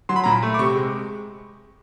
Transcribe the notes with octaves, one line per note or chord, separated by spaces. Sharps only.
F#3 C6
B5
A#2 A#5
B5
A3
D6
C3 C#6
G#3